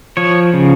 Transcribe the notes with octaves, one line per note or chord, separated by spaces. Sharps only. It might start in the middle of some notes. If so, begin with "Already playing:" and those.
F3 C#5
C#3